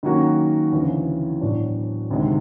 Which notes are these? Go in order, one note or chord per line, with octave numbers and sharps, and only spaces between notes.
D#3 F#3 A#3 C#4 F#4
D2 C#3 E3
A2 F#3 B3 D4 F#4
D2 C3 D#3 G#3